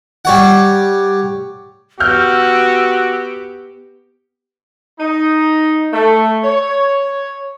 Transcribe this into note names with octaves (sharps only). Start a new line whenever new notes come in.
G3 C#5 F#5
B3 F#4 G4 E6 F6 G6
D#4
A3
C#5